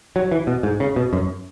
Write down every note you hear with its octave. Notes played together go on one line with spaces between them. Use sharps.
F#3
E3
B2
G#2
C#3
B2
F#2